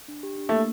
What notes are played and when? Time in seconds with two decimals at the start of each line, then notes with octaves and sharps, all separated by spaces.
0.08 D4
0.23 G4
0.38 D4
0.49 A3 A#3